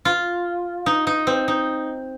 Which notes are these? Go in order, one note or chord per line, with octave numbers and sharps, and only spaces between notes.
F4
D#4
D#4
C4
D#4